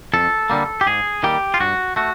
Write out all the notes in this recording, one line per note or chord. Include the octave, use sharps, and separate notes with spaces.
F2 A4
D3 G3 A#3
G4
G#2 G#4
D#3 G3 A#3 G4
F4
G2 F#4
A3 F#4